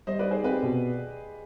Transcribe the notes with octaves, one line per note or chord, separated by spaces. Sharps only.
G3 C5 D#5
B4 D5
D#4
G#4 C5
C4 G4 B4
B2